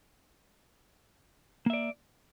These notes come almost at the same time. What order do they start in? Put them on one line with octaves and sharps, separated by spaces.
A#3 E5 D5